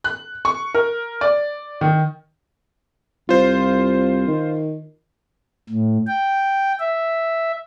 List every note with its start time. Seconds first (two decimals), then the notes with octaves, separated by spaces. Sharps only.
0.04 F#6
0.45 C#6
0.74 A#4
1.21 D5
1.81 D#3
3.29 C2 F4 C5
4.28 D#3
5.70 A2
6.07 G5
6.80 E5